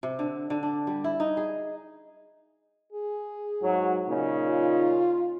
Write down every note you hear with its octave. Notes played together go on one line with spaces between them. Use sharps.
C3
D3
D3
D4
G3
E4
D#4
G#4
G#4
G#2 F#3
A#2 C#3 D#4
F4